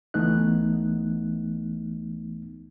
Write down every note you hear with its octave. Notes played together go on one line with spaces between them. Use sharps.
C#2 E3 A3 B3 D#4 F#6